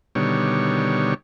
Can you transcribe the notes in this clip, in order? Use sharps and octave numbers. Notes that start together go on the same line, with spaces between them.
B2 D3 D#3 G3 C#5